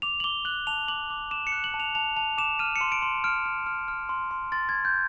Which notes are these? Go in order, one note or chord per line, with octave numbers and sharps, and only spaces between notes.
D6 F7
F#7
D6 G7
F#6 F#7
A5 F7
D6 F#7
D6
D6 E7
C#7
F#6
F#7
A5
F7
A5 F7
A5 F7
D6 E7
F6 D#7
C#7
C6
D7
C6
F6 D7
F6
F6
F6
C6
C6
C6 A6
G#6
C6
G6